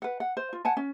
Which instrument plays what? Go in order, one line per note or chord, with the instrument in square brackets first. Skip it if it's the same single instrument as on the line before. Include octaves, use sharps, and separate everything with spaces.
[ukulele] B4 F#5
F#5
C5
F4
F#5 G#5 A5
C#4